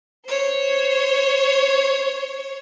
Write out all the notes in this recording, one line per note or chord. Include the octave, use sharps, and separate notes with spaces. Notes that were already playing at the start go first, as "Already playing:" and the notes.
C5 C#5